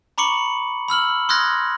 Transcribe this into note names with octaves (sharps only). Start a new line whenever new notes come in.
A#5 B5 C#6 D6 C#7 F#7
B5 E6 F6 F#7
C6 D#6 F6 F#6 G#6 A#6